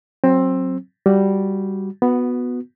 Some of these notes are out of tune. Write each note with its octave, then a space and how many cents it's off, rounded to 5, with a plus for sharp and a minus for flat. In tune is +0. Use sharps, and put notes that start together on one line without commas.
F#3 +0 C4 +15
G3 +0 F#4 +0
B3 +0 F#4 -20